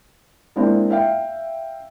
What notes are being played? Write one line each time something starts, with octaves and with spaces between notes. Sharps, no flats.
G#3 A#3 C4 D4 E4 F4
E5 F5 G5